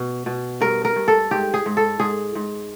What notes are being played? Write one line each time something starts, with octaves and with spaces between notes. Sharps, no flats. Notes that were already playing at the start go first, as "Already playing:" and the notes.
Already playing: B2
B2
G2 A#4
A#4
G2
A4
G#2 G4
G#4
G#2
A4
G#2 G#4
G#2